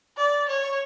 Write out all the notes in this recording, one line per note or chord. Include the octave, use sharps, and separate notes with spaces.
D5
C#5